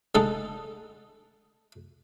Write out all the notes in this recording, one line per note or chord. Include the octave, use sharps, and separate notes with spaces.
D3 G#3 D#4 A4